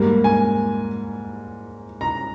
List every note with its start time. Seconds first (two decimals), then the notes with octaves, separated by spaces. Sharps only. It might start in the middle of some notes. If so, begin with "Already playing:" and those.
Already playing: G#2 G3 A#3
0.24 G#5
2.01 A#5